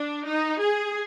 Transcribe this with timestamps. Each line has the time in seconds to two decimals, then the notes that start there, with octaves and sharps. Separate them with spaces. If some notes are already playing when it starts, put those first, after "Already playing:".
Already playing: D4
0.26 D#4
0.60 G#4